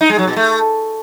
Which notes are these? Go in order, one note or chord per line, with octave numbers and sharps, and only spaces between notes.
D#4
G#3
F#3
B2
A3